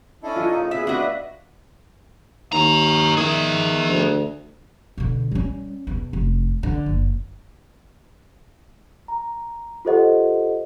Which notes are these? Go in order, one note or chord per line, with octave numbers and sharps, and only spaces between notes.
C#4 D4 E4 A4 D#5
F4
A2 C#3 D#4
D2 B3 G#4 E5
D4 F#4 B4 D#5 E5
D#2 C#4 A#5
D#3 G#4 E5
D2
B2 D3
G3 C#4
E2 B2
F1
D3
F#1
A#5
F4 G4 A4 C5 D#5 F#5